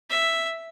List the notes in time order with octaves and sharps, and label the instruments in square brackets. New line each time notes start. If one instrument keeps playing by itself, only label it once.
[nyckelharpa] E5